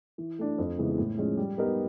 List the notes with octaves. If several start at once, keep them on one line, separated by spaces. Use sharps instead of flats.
E3
A3 D4
F2
C#3 E3 G#3 B3
A2
F3 G#3 C#4
G3
B3 D#4 G4 A#4